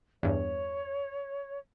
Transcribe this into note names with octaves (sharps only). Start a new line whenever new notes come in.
E2 G2 C#5